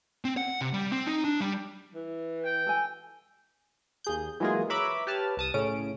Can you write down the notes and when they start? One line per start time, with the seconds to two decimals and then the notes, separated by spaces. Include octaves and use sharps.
0.25 C4
0.37 F#5
0.61 C3
0.73 G3
0.91 C4
1.06 D#4
1.24 D4
1.40 G3
1.95 E3
2.45 G5
2.67 A4 G#5
4.04 D#2 G#4 G6
4.40 E3 F#3 G#3 A#3 F4 G#4
4.70 B4 C#5 E5 A#5 B5 D6
5.07 G4 B4 C#5 A5 F6
5.37 C2 A5 D#6
5.54 A2 C#3 C#4 D7